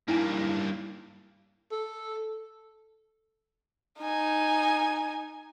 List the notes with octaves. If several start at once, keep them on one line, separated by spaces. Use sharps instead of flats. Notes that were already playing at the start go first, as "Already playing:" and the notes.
G2 A#3 D#4 E4 G#5
A4
D#4 G#5